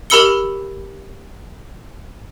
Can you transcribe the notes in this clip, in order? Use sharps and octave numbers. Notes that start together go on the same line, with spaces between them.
G4 A#4 B5 E6 C#7 G7